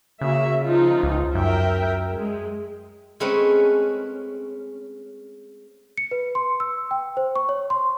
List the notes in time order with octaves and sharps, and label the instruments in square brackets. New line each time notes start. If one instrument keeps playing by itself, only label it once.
[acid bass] C#3 [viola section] A#3 F#4 E5
[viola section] F3 D#4 F4
[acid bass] C#2
[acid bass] F#2 [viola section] A#4 E5 G5
[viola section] G#3
[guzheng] G#3 A3 C4 C#4 B4
[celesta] C#7
B4
C6
E6
G5
C5
C#6
C#5
C6